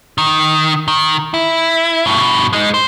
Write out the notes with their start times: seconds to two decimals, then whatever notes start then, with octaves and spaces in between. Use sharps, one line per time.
0.18 D#3
0.88 D#3
1.34 E4
2.06 G2 B2
2.53 G#3 D#4
2.74 C5